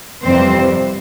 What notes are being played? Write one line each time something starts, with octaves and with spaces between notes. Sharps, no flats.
F2 C3 E3 G3 C4 C5